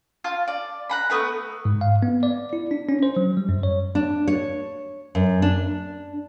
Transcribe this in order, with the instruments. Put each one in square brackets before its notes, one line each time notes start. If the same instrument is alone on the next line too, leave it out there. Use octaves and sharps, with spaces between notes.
[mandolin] F4 F5 A5
D5
F#5 A#5 B5
A3 B3 B4 A#5
[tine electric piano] G#2
F5
B3
D5
E4
D4
C#4
C5
F#3
G3
F#2
C#5
[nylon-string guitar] D4
C#5
F#2
D4